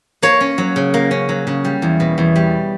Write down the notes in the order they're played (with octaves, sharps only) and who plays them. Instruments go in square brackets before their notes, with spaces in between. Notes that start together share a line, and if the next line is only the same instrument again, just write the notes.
[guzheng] A#3 C#5
C#4
F#3
C#3
A#3
C#4
F#3
C#3
G3
E2
B2
E2
G3